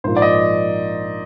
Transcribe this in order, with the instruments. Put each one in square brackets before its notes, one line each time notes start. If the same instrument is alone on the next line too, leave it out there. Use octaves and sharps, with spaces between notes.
[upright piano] A#1 G#2 F3 A#3 F4 [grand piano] C5
[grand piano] D5
D#5